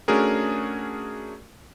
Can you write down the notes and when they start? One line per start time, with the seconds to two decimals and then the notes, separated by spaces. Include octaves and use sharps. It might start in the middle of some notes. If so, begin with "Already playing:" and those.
0.08 A3 C#4 D4 F#4 G#4 A#4